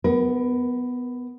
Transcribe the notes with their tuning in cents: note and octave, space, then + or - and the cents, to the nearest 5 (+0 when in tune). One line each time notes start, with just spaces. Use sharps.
B3 +10 A#4 +35